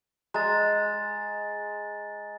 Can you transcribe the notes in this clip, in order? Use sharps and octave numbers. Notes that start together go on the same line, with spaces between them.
G#3 A#5 A6